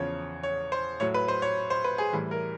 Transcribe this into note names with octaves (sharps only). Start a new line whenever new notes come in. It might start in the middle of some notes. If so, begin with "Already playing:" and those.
Already playing: E2 C#3 F3 C#5
C#5
C5
A2 F#3 C#5
B4
C5
C#5
C5
B4
G#4
A2 E3 G3
A#4